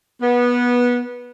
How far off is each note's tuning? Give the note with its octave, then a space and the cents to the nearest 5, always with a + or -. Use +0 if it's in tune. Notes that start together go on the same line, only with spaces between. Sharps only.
B3 -20